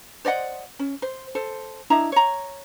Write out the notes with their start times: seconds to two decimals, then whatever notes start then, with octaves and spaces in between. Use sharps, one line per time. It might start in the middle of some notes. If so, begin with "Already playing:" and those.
0.25 C5 D5 D#5 F#5
0.79 C#4
1.02 C5
1.35 A4 C5
1.90 D4 E4 D#5 A#5
2.12 C#5 A#5